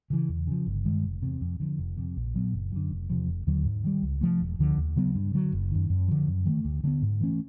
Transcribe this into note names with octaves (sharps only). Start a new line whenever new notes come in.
C#3 E3
E2
C#3 F3
G1
G2 D#3 G#3
F1
E2 C3
F2
D3 F3
F1
F2 C3
A#1
A#2 F#3 B3
F#1
F#2 D3
F1
E2 C3 F3
F1
D#2 D3 F#3
G#2
D#3 G3
C#2
C3 F3 A3
E1
D2 D3 F3
D#2
C#3 F#3 B3
G2
D3 F#3
F#1
F#2 D#3
F#2
D3 F3
F#2
D#3 F#3 A3
D2
D3 G3 B3
G#2
E3 A3 C#4